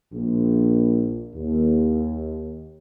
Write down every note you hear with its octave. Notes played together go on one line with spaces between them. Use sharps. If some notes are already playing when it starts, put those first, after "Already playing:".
A#1
D#2